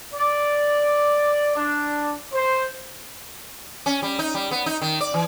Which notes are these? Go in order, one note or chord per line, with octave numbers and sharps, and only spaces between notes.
D5
D4
C5
C#4
G3
D#4
G3
B3
D#4
D#3
D5
E3